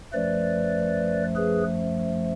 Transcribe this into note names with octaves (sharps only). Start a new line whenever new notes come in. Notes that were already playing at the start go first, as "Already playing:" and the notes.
F#2 F3 A3 B4 D5
G#4 B4